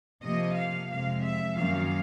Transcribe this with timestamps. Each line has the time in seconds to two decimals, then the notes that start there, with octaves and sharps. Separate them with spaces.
0.23 C3 F3 A#3 D#5
0.57 F5
0.91 F2 C3 F3 G#3 F5
1.24 E5
1.58 F#2 D#3 F#3 A#3 F5